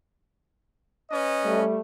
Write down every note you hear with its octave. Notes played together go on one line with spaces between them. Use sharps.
C#4 B4 D#5
G3 A3